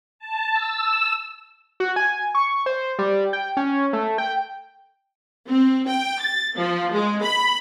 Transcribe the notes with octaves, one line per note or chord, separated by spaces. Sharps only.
A5
E6
F#4
G#5
C#6
C5
G3
G5
C#4
A3
G5
C4
G5
A6
F3
G#3
B5